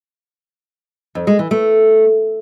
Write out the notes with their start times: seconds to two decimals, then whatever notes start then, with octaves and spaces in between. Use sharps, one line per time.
1.15 F2
1.27 G#3
1.39 E3
1.51 A3